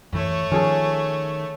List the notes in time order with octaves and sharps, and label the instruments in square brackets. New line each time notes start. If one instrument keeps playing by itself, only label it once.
[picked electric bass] F#2 E3 [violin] A3 C#5
[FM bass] D#3 [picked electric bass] F3 [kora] C#4 G#4 A4